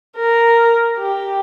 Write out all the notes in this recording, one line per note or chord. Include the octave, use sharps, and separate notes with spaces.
A#4
G4